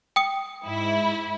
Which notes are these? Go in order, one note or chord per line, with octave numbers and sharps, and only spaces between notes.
G5 D#6 C#7
G#2 E4